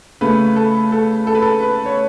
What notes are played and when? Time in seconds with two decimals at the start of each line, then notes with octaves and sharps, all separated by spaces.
0.21 C#3 A3 B4
0.56 A4
0.92 A4
1.27 A4
1.35 B4
1.42 A4
1.62 B4
1.86 C#5